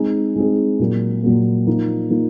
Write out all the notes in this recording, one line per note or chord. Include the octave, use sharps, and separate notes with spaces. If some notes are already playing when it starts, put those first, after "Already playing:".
Already playing: G#3 C4 D#4 G#4
G#3 C4 D#4 G#4
A#2 F#3 A#3
A#2 F#3 A#3
F3 A#3 D#4
F3 A#3 D#4